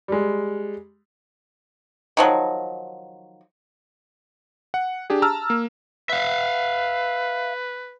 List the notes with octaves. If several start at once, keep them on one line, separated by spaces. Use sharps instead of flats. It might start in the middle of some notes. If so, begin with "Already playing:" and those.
G3 G#3
D#3 F3 F#3
F#5
D4 G4 G#4
A5 A#5 E6 F6
A#3
B4 E5 F5